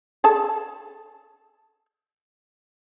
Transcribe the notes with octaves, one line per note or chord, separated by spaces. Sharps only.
G#4 A4 A5